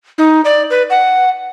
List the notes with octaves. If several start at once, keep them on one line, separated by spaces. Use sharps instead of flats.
D#4
D5
B4
F#5